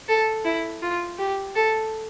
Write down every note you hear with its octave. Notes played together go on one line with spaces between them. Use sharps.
A4
E4
F4
G4
A4